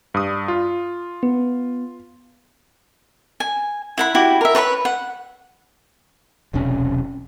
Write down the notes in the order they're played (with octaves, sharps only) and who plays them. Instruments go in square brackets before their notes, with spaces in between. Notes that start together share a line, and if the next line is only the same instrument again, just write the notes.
[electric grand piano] G2 D#6
F4
[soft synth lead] B3
[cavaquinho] G#5
E4 F#5 B5
E4 F#4 G4
A#4 E5
B4 C#5 A5 B5
F#5
[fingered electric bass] E1 B1 C3 C#4